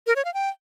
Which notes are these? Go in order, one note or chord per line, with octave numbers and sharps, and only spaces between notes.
A#4
C#5
F5
G5